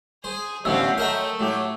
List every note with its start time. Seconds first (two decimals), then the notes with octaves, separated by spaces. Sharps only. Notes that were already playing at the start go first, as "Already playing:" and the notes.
0.24 G#4 C5 G#5
0.65 A1 F#2 B2 D3 C4 F5 F#5 E6
0.98 A3 A#4 D#5 G5
1.40 A2 F#3 G4